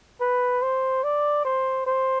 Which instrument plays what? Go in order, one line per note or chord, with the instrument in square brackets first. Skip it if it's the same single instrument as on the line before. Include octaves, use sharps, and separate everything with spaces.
[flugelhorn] B4
C5
D5
C5
C5